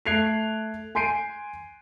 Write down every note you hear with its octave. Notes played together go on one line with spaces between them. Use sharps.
A3 F#6 G#6 C7 D7 F7
G#5 C6 G6 C7 D7 D#7